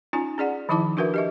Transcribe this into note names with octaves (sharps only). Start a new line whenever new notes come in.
C#4 D#4 F4 G#5
C#4 G#4 D5 F#5
D#3 F3 D#4 E4 A5 D6
D4 F#4 A#4 B4 E5
G4 D#5 E5